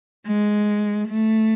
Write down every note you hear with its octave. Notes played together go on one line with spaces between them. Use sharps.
G#3
A3